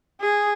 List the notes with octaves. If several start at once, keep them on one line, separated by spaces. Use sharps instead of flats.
G#4